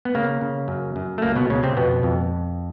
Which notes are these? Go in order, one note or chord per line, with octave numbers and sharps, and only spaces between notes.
B3
C#3 A#3
C#3
F#2
F#2
A3
C#2 A#3
B2 B3
C#2 C#3 C#4
C3 C4
F2 B2 B3
F2